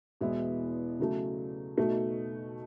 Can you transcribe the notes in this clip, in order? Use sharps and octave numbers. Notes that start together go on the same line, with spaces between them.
E2 B2 G#3 B3 E4
C#3 F#3 A3
B2 A3 D#4 F#4